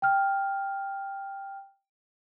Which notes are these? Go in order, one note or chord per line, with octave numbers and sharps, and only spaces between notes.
G5 F6